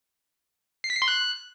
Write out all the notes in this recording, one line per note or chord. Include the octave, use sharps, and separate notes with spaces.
C7
B6
C7
C6
F#6